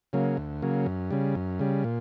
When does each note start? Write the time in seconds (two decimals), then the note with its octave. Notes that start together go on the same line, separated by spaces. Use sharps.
0.13 C#3 F#3 A#3
0.37 D2
0.62 C#3 F#3 A#3
0.86 F#2
1.11 C#3 G3
1.35 F#2
1.59 C#3 G3
1.84 A#2